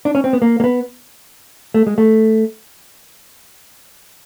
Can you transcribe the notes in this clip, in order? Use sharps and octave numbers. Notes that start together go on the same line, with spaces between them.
D4
C#4
C4
B3
A#3
A#3
B3
A3
G#3
A3